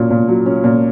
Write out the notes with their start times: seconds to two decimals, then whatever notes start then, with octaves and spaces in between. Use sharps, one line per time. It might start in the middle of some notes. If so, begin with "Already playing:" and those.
Already playing: A#2 F#3 C#4
0.11 A#2
0.29 F#3
0.46 C#4
0.64 A#2